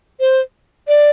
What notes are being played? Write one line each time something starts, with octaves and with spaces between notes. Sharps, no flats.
C5
D5